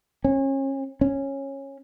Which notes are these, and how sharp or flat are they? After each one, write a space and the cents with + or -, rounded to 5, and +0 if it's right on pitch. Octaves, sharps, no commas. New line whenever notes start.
C#4 -35
C#4 -15